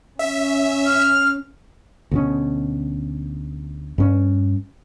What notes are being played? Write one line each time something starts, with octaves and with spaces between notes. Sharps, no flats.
C#4 E5
F6
D2 B2 C#4
G2 C#4